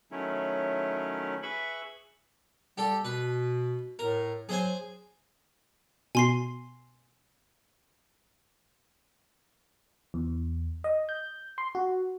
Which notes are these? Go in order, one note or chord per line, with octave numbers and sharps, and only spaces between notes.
D#3 F#3 A3 C#4 E4
G#4 B4 E5 B5 C#6
G3 G4 A4
B2 B4
A2 A#4
F#3 G#4 C5 G#5
B2 G#5 C6 C7
E2
D#5
G6
C6
F#4